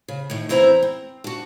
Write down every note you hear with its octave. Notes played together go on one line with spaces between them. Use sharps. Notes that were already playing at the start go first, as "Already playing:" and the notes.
C#3
A2 D#3
E2 C4 E4 C5 A#5
C4
D4 F#4